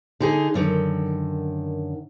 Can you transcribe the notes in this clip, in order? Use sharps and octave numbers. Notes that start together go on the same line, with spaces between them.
D3 D#4 G#4
F#2 D3 D#3